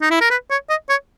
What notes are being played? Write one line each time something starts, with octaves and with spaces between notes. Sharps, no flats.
D#4
E4
A#4
B4
C#5
D#5
C#5